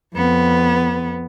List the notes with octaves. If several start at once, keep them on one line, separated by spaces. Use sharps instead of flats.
F2 B3